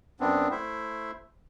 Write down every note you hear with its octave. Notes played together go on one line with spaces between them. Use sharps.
F#2 B3 C4 D4
A3 E4 C5 E5